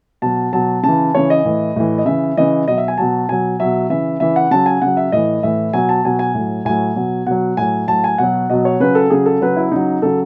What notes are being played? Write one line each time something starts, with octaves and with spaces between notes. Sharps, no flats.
B2 F#3 A5
B2 F#3 A5
C#3 E3 A5
C#3 E3 C#5
D#5
A2 E3
A2 E3
D#5
C#3 E3 E5
C#3 E3 D#5
B2 F#3 D#5
E5
G#5
B2 F#3 A5
B2 F#3 G#5
B2 F#3 E5
C#3 E3 E5
C#3 E3 E5
F#5
C#3 F#3 A5
G#5
C#3 F#3 F#5
E5
A2 E3 D#5
A2 E3 E5
B2 F#3 G#5
A5
B2 F#3 G#5
G#5
A2 F#3
A2 F#3 G#5
B2 F#3
B2 F#3 F#5
A2 F#3 G#5
A2 F#3 A5
G#5
B2 F#3 F#5
B2 F#3 D#5
C#5
C#3 F#3 B4
A4
C#3 F#3 G#4
A4
C#3 F#3 B4
E4
C#3 F#3 D#4
C#3 F#3 A4